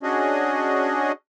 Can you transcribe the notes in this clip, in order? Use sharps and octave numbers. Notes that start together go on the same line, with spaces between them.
C#4 D4 F#4 G#4 D#5